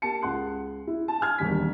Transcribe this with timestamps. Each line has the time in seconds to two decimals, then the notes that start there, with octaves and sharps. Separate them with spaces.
0.02 A#3 G4 A5 C#7
0.22 C#2 G#4 F#5 C6 F#6
0.87 E4
1.08 A5
1.21 G#5 F6 G#6
1.38 E1 D#2 G3 B6